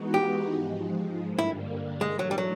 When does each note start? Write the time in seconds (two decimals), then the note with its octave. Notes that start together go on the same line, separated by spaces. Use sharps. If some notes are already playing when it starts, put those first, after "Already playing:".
Already playing: E3 G#3 B3 D#4 F#4
0.14 G4
0.51 G#2 F3 G#3
1.26 G2 D3 G3 A#3
1.39 E4
2.01 G#2 E3 G#3 A3 D4
2.19 F#3
2.31 G3
2.38 F#3